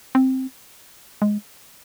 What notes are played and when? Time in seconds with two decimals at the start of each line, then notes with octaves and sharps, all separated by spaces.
0.15 C4
1.22 G#3